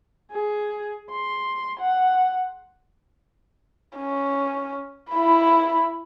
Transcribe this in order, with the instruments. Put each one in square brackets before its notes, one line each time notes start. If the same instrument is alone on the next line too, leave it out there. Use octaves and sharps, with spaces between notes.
[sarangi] G#4
C6
F#5
[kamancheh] C#4
E4 B5